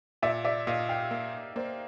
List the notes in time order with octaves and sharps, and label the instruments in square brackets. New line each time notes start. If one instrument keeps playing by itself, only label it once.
[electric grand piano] A#2 [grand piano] D5 E5
[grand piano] D5 E5
[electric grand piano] A#2 [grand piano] D#5 F5
[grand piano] F5 G5
[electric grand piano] A#3
[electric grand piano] A#3 [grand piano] C5 D5